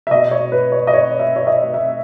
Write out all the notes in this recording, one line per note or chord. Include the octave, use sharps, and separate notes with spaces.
E5
B2 D#5
C#5
B4
C#5
D#5
C#5
E5
C#5
D#5
E5